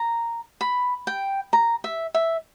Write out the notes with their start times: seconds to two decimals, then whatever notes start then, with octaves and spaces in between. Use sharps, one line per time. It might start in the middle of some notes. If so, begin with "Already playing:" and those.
Already playing: A#5
0.61 B5
1.07 G5
1.53 A#5
1.84 E5
2.14 E5